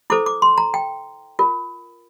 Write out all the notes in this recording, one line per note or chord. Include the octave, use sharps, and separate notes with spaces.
E4 A4 C5 D6
D6
C6
A#5
G5
F4 A#4